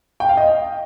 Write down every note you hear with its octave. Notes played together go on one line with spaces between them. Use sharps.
G5
F5
D#5